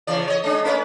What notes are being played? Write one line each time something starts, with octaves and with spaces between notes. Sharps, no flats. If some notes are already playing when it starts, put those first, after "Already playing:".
C#3 E3 D5
C#5 D#5
G#3 C#4 D4
A3 C#4 B4